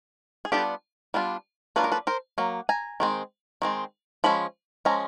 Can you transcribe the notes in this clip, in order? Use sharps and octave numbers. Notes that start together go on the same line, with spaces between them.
G#4
G3 B3 D4 F4 G4 A4
G3 B3 D4 F4
F#3 A#3 D4 F4 B4
A#4
A4 B4
A#4 C5
F#3 A#3
G#5 A#5
D#3 G#3 C4
D#3 G#3 C4
F3 G#3 C#4 B5
F3 G#3 C#4 A#5